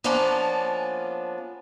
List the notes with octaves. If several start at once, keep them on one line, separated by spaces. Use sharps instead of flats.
F3 A#3 B3 C#4 D4